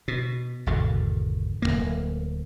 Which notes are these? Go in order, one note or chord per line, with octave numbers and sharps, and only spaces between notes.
B2
G#1 E2 B2 D3
D1 C#2 A#3